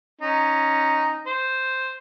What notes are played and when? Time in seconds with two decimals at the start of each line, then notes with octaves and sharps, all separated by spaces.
0.21 C#4 D#4
1.27 C5